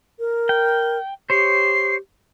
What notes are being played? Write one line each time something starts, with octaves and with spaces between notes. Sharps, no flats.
A#4
G5
G4 C5 C#5 C7